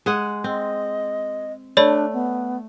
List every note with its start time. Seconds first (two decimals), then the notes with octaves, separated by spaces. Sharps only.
0.06 G#3 G#4 F#5
0.44 C4 D#5
1.77 A3 D4 C#5 D5 B5
2.13 B3